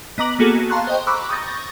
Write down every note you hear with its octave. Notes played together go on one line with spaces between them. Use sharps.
B3 D#5 A#5 D6 F#7
A#3 B3 F#4 G#4 A4
F5 A5 A#5 C6 C#6 F#6
C5 D#5 G5
A#5 B5 C#6 D6 E6 F#6
C#6 D#6 G6 A6 A#6